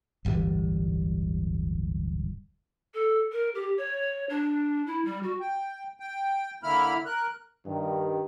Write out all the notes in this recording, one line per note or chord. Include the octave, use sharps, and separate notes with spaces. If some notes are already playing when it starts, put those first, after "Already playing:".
D1 G1 E3 G3
A4
A#4
G4
C#5
D4
E4
G3
F#4
G5
G5
D3 A#3 E4 B5 F6
A#4 F#6
G2 D#3